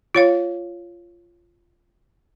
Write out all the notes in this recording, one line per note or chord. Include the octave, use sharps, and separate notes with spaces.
F4 C#5 F5